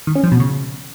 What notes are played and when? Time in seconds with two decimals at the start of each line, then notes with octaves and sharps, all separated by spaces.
0.07 D#3
0.15 C#4
0.24 F3
0.32 B2
0.40 C#3